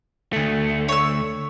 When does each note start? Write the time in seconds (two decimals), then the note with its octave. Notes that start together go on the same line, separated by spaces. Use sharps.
0.33 D2 A3
0.89 C#5 E6